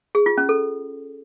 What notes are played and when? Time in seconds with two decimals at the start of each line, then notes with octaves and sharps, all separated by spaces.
0.15 G#4
0.26 F4
0.38 C#4
0.49 A4